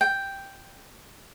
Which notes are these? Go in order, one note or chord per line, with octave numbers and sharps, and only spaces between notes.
G5